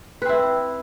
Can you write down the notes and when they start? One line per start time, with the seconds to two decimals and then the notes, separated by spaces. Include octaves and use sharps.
0.22 B4
0.26 C4
0.29 E4